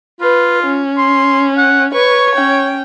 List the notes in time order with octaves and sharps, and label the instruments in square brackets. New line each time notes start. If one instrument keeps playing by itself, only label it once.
[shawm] F4 [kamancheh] B4
[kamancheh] C#4
[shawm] C6
F#5
[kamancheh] B4 C#6 [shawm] C#5
[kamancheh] C#4 G5